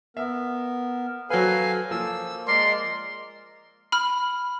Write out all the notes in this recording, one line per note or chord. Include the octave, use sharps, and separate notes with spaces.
B3 A#4 E5
F#3 A4 B4 C5 F5 G#5
F3 A#3 E6
G#3 A#4 D5 C6
B5 F6